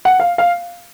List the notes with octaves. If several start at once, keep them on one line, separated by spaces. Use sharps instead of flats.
F#5
F5
F5